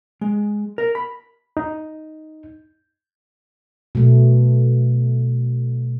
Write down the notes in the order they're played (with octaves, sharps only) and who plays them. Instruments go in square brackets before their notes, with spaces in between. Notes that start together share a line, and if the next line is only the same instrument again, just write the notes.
[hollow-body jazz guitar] G#3
A#4
B5
[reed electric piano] D#4
[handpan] B2 A3